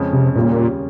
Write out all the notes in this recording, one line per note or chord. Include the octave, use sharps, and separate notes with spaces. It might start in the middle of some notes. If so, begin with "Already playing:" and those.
Already playing: F2 C#3 G#3 C#4
C3
D#2 A#2 C#3 G3 C#4